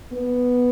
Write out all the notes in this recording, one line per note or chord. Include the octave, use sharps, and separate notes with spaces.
B3